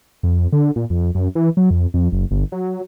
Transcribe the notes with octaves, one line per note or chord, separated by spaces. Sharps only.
F2
D3
A#2
F2
F#2
E3
F#3
F2
F2
F#1
G1
F#3